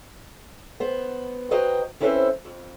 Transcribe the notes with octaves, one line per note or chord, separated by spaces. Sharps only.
B3 C5
F#4 B4 C5 D#5 G5 A#5
C4 C#4 E4 A4 B4 C5
F2